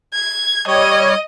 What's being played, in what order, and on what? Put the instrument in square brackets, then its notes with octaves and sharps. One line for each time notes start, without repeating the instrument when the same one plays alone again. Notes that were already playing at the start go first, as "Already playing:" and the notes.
[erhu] G#6
[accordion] G3 C#5 [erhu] D#5